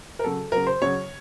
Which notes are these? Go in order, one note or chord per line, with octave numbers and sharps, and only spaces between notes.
A#4
C#3 F#3 A4
C#3 F#3 A#4
C5
C#3 F#3 C#5